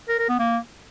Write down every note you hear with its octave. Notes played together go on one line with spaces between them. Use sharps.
A#4
A#4
B3
A#3